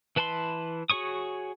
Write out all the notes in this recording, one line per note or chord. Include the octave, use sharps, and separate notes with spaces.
E3 B4 A5 B5 C6
F#4 G#4 C#5 C#6 D#6